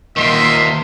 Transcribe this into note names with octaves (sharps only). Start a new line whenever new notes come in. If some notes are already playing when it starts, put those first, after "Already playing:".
A#2 D#3 A#3 D#5 E5 C6